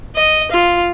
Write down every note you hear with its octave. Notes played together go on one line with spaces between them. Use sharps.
D#5
F4